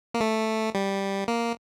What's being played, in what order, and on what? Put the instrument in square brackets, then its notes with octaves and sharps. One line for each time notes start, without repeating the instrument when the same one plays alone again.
[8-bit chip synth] A#3
A3
G3
A#3